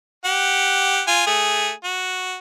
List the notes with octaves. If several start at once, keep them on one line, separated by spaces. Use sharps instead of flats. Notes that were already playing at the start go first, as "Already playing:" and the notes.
G4 F#5
F4 G#5
A3 G#4
F#4